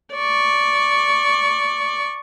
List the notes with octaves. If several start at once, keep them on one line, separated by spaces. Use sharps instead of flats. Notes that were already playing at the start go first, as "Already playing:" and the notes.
D5 C#6